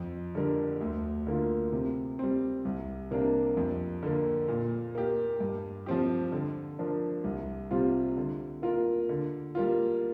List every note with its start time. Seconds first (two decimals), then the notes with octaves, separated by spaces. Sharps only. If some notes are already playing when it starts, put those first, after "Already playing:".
Already playing: F2
0.35 D3 G3 D4 A#4
0.81 D2
1.27 D3 A#3 F4
1.72 C3
2.19 G3 C4
2.65 C2
3.11 C3 A#3 D4
3.57 F2
4.03 D3 A#3
4.48 A#2
4.95 A#3 G4
5.40 G2
5.86 F3 C4 G4
6.32 D3
6.79 F3 D4 A#4
7.24 C2
7.71 C3 G3 C4 F4
8.17 D3
8.62 A#3 F4 A#4
9.09 D3
9.55 G3 A#3 F4